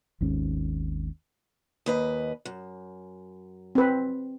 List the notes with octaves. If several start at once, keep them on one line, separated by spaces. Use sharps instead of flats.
G#1 D#2 G#2 C#4
D#2 B4 D#5
F#2
C4 B4